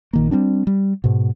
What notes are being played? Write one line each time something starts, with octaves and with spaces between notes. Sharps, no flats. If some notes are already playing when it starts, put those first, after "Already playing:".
A#1 D#3 A#3
G3 B3 C4 D4
G3
G#2 B2